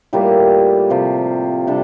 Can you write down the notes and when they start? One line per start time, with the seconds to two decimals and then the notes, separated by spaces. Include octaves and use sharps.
0.13 A2 G3 A#3 F4
0.90 C3 F3 C4 F4
1.67 C3 G3 D4 A4